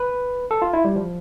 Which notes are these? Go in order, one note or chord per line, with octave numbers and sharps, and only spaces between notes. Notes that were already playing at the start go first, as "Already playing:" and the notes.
Already playing: B4
A4
F4
E4
G3
F3